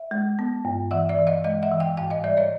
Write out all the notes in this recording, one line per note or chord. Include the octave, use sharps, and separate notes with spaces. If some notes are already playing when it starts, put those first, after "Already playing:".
Already playing: E5
G#3
B3
G2
E3 E5 F#5
D5 E5
E3
D#5 F5
G#3 D#5 F5
E5 F#5
E3
F5 G5
G#2 F5 G5
D#5 F5
G3 D5 E5
C#5 D#5